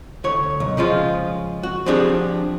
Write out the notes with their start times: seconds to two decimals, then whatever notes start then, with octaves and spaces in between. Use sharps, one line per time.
0.24 D2 C#5
0.60 B1
0.77 C#3 F3 G#3 F4
1.63 F#4
1.86 F3 C4 D4 G4 G#4